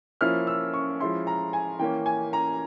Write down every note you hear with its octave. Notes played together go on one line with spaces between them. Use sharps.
F3 A#3 C#4 E4 F6
E6
C#6
F3 G#3 C#4 E4 C6
A#5
G#5
E3 A#3 C#4 G5
G#5
A#5